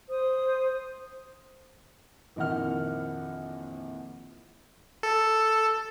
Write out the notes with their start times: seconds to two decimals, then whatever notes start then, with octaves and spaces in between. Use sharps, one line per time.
0.10 C5 D#6
2.36 A#1 F2 D#3 E3 F#5 F6
5.03 A4